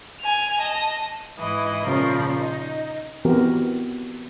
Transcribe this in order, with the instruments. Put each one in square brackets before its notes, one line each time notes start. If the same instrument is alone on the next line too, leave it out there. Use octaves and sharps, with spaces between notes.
[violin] G#5 F7
D#5 A5
[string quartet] G#2 E3 E4 D#5
A#2 C#3 F3 A#4 C6
D#4
[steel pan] E3 B3 C4 F#4 G4 A#4